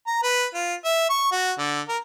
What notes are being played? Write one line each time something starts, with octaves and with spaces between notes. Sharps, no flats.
A#5
B4
F4
E5
C#6
F#4
D3
A#4